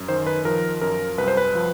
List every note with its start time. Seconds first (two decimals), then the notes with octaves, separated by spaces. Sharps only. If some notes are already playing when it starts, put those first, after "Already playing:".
Already playing: F#2
0.08 D#3 C5
0.27 B4
0.45 F3 A#4
0.81 F#2 A#4
1.18 C2 B4
1.28 C5
1.37 B4
1.55 F3